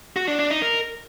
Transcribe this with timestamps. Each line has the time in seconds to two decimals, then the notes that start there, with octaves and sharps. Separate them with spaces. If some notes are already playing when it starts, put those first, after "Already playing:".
0.16 F#4
0.28 D4
0.39 D4
0.50 D#4
0.62 A#4